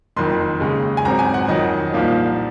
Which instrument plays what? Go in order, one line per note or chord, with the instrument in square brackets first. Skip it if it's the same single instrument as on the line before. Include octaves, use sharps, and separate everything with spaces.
[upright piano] F#1 F2 D#3 C6
D#2 C#3 G#3
G#5
G#1 G#2 F#3 C4 A#5
G#5
F#5
F2 D#3 F#3 D#5
C2 A#2 F3 A#3 D#4